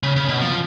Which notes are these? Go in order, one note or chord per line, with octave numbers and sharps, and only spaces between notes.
C#3
C#3
B2
F3